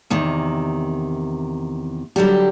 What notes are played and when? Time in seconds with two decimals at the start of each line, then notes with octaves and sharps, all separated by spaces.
0.10 E2 C3 D#3
2.16 D3 F#3 G3 G4